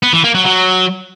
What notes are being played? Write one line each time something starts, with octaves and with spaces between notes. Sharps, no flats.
B3
E3
A#3
F#3
F#3